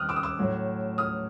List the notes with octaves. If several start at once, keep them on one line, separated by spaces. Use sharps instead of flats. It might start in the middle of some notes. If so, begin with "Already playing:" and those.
Already playing: D#3 G3 C4 D#6 F6 F#6
D6 E6
D#6
D6 E6
A2 F#3 A3
D#6 F6